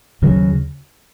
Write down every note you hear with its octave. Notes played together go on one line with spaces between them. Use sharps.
D#2 C#3 F#3